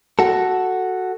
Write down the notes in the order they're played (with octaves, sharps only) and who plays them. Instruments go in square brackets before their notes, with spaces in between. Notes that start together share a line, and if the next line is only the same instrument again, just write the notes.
[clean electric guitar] F#4 A4